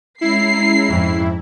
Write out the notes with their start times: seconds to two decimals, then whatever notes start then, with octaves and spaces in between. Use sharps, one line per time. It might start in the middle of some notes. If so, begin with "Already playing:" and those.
0.21 G#3 C#4 E4 A#5 C7
0.88 F2 G#2